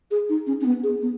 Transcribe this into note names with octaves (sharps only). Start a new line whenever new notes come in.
G#4
D#4
C#4
C#4
B3
G#4
B3